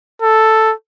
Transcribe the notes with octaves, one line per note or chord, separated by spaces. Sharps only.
A4